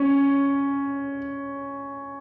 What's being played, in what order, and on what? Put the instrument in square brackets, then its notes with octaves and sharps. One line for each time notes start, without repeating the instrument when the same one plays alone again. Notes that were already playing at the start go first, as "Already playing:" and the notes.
Already playing: [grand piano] C#4